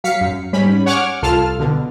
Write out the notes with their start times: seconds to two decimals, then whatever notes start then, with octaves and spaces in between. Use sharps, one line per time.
0.04 F#3 F5 B6 C#7
0.21 F#2
0.53 G#2 G3 C#4 B5
0.86 C#5 F#5 G#5 C#6 D6 F6
1.22 C2 C3 F4 A4 A5 F6
1.59 B2 D3